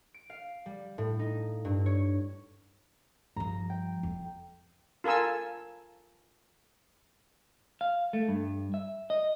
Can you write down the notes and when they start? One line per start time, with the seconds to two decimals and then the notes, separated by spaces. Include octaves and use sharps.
0.14 D7
0.30 F5
0.66 G3
0.98 A2
1.19 D#4
1.65 G2
1.86 C#5
3.36 G2 F3 A#5
3.70 G5
4.03 F2
5.04 F4 A4 A#4 G#5 E6
7.81 F5
8.13 A3
8.28 G2
8.74 E5
9.10 D#5